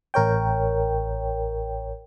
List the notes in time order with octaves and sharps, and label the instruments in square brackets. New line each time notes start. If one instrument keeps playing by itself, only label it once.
[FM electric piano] A1 A#4 C#5 G5